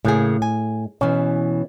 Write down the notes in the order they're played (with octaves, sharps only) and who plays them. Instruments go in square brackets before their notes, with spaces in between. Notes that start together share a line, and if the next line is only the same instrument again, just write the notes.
[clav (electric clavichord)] A2 [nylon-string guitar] C#3 A#3 G#4
[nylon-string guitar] G#5
[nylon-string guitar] B2 E3 [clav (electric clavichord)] C#4